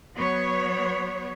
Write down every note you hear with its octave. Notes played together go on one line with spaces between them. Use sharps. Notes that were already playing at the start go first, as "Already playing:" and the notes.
F#3 B3 C#5